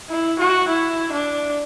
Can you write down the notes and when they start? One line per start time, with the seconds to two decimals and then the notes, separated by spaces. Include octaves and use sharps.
0.09 E4
0.39 F#4
0.68 E4
1.12 D4